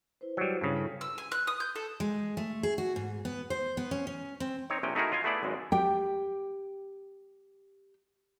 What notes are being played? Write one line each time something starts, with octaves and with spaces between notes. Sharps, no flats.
E4 B4 C5
F#3 G3
G2 C#3 G3 C#4 E4
E4 A4 C#5
E6
G#5
F#6
D#6
G6
A4
G#3
A3
G#4
F#4
G#2
B3
C5
B3
C#4
C#4
C4
C4 D#4 C#5
A#1 C3 C#4 G5
A3 D#4 E4 F#4 G#4 A#4
F4 D#5 F5 G#5
A3 B3 E4 G#4 D5
G#1 F#2 G#3
G4 G5